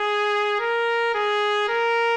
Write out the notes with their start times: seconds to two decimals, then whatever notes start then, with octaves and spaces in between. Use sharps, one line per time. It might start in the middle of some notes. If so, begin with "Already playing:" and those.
Already playing: G#4
0.60 A#4
1.15 G#4
1.69 A#4